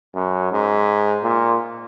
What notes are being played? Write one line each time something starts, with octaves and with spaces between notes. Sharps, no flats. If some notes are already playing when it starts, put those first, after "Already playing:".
F#2
G#2
A#2